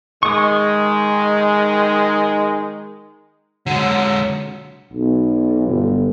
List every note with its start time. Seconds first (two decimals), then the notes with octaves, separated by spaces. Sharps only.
0.23 D#3 G#3 C#6 D#6
3.66 D3 F#3 G#3
4.93 B1
5.67 G1